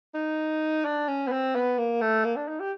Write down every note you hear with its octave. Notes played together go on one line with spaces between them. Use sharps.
D#4
D4
C#4
B3
C4
B3
A#3
A3
A#3
D4
D#4
G4